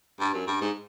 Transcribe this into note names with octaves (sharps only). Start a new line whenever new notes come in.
G2
F#2
G2
G#2